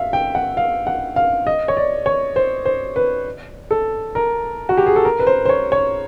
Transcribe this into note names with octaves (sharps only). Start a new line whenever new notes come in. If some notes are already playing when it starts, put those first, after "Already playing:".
Already playing: E5 F5
G5
F#5
F5
F#5
F5
D#5
C#5
D5
C#5
C5
C5
B4
A4
A#4
F#4
G4
G#4
A4
A#4
B4
C5
C5
C#5
C#5